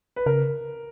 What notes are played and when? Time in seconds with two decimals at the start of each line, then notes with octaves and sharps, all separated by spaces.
0.16 B4
0.26 C#3 A#4